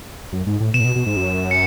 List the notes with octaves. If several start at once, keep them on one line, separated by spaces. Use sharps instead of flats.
F#2
G#2
A2
B2 E7
A2
B2
B2
G#2
F#2
C#7